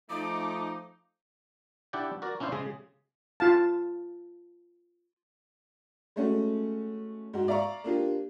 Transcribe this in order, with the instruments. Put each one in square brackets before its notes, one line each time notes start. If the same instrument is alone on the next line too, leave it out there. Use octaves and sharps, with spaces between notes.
[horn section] F3 A3 D#4 [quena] D6
[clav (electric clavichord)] D4 E4 G4 D5 F#5 G5
F#4 A#4 D5
C#4 D4 E4 C5 F5
C#3 G#3 G#4
[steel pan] F4 F5 A5
[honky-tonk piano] G#3 A3 C#4 F#4
G#2 F#4
D5 E5 F5 A#5 C#6
A#3 D4 F4 G4